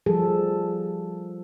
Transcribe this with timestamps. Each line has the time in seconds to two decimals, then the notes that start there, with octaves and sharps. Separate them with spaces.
0.06 F3 G3 G#4 A4